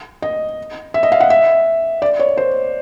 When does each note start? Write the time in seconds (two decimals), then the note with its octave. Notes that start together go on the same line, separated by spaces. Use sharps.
0.22 D#5
0.94 E5
1.03 D#5
1.12 F5
1.20 F#5
1.30 E5
2.02 D5
2.19 C#5
2.37 C5